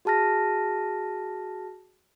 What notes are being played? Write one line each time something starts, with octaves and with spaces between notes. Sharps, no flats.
F#4 G#4 A5 F6 A#6